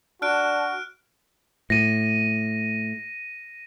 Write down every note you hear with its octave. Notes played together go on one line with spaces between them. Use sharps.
D4 F#4 A5 F6 F#6 D7
A2 A#6 D#7